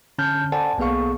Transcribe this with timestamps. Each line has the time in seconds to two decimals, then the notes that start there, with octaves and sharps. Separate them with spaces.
0.18 D3 C#4 A5 F6 G6
0.52 A4 C5 D5 F#5 G#5 A5
0.78 B1 A#3 B3 G#4 F5 C#6